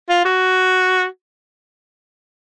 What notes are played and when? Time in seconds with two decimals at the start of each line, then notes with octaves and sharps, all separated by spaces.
0.10 F4
0.25 F#4